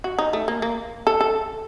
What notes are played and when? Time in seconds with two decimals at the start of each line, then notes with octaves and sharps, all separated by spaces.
0.04 F#4
0.19 D#4
0.33 A3
0.48 A#3
0.62 A#3
1.07 A4
1.21 A4